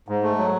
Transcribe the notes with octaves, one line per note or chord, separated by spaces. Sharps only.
G#2
A3
F#3